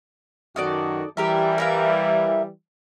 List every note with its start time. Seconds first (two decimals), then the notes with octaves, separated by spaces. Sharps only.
0.56 F#2 D#3 D#4 F#4 A4 D5
1.17 E3 G3 G4 A#4 E5
1.58 A#4 E5 F5